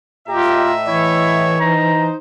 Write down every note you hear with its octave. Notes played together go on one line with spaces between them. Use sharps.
A2 F4 G4 D#5 E5 A#5
E3 E4 C#5
D#4 C5 A#5